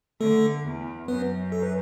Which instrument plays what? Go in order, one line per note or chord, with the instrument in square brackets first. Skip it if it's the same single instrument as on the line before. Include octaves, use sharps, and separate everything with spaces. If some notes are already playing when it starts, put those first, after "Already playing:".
[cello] D3 [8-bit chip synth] A3 A4
[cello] E2
[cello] F#2 [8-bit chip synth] B3 B4
[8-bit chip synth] A4
B4